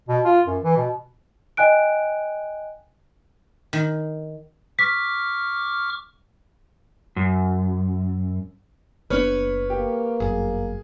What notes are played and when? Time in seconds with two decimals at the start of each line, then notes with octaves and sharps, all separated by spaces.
0.08 B2
0.25 F4
0.47 F#2
0.63 E3
0.77 B2
1.57 D#5 G5 G#5 F#6 D7
3.73 D#3
4.79 C#6 D6 F6 B6
7.16 F#2
9.10 F#1 B3 D4 B4 C#5 F6
9.70 A#3 G4
10.20 G1 F#2 G#4